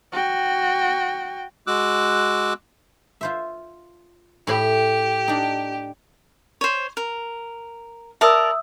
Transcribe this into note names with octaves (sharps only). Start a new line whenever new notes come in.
F#4 G5
G#3 F#4 D6 E6 F#6
F4 C5 E5
A2 G4 B5
D4 D#4
C5 C#5
A#4
A#4 D5 E5 A5 D#6 E6